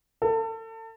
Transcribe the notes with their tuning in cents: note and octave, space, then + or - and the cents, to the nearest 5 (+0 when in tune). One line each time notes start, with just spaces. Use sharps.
A4 +35